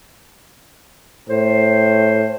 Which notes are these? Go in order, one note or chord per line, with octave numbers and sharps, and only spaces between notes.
A2 C5